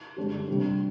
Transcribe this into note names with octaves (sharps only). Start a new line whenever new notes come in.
G2 D3 G#3 D4 G4
C3 G3 D4